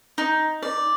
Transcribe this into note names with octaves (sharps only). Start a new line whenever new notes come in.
D#4
D5